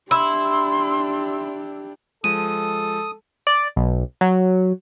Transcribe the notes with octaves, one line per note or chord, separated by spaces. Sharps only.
D4 E4 G4 C6 E6
F3 G#3 A4 D#6 D#7
D5
B1
F#3